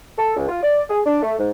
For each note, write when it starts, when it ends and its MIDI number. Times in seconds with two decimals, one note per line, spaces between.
0.18 0.37 69
0.37 0.47 37
0.49 0.63 65
0.63 0.82 74
0.90 1.00 68
1.06 1.19 62
1.22 1.34 57
1.39 1.51 44